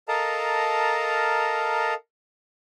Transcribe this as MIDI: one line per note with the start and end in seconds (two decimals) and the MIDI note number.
0.08 1.94 69
0.08 1.94 70
0.08 1.94 75
0.08 1.94 77
0.08 1.94 81
0.08 1.94 82